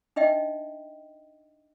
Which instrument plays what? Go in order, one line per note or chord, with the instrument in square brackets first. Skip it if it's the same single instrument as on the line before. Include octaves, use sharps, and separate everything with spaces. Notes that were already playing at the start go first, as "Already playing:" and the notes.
[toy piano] D4 D#4 D#5 E5 G5